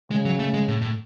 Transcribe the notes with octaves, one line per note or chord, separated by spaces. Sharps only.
C#3 G#3
F#3
A3
G#3
A2
A2